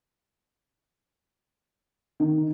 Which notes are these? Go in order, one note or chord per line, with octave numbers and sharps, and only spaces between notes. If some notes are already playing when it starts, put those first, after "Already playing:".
D#3